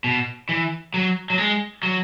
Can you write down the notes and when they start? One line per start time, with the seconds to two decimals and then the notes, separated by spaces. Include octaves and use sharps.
0.04 B2
0.49 E3
0.94 F#3
1.30 F#3
1.38 G#3
1.83 F#3